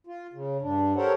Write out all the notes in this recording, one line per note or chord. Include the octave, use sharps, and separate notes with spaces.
F4
C#3
G2 D4
G4 A4 A#4 C5 C#5 F#5